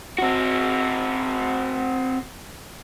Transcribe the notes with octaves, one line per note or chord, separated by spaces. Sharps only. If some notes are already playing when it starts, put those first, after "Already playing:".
C4 F#4